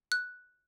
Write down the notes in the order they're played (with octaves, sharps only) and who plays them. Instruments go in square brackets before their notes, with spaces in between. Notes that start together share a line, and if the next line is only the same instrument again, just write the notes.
[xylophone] F#6